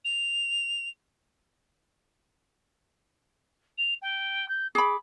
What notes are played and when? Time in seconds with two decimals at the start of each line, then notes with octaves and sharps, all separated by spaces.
0.05 F7
3.78 F7
4.02 G5
4.48 G6
4.75 G#4 B5 D6